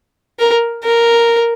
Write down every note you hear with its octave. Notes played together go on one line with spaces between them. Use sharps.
A#4
A#4